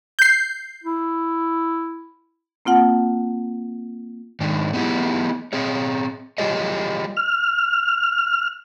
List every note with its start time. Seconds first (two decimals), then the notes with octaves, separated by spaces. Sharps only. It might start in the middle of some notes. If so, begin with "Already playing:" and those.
0.19 G6 C7
0.84 E4
2.65 A#3 C4 F4 F#5 A5
4.40 G#2 D#3 D4
4.73 A3 B3 D#4 E4 G4 G#4
5.53 C4 G#4 C#5
6.38 G3 F4 G4 G#4 C#5 D#5
7.17 F6